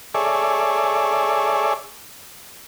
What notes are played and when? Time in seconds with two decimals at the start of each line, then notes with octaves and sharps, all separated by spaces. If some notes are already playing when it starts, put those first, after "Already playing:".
0.14 G#4 A4 C#5 D5 E5